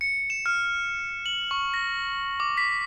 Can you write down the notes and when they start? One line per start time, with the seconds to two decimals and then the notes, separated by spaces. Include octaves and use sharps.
0.01 C#7
0.30 E7
0.46 F6
1.26 F#7
1.51 C#6
1.74 A#6
2.40 D6
2.57 B6